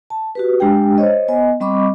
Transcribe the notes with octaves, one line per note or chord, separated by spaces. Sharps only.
A5
F#4 G4 B4
G#3 D4 G4 G5
C5 C#5 D#5
B3 D#5 G#5
G3 C4 D#5 B5 C#6 D6